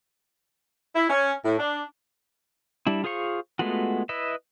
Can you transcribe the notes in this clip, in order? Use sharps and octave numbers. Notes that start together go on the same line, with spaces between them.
E4
C#4
A2
D4
G3 D4 E4
F4 G#4 C5 F5 C#6
G#3 A3 B3 F4 F#4
E4 B4 D#5 E5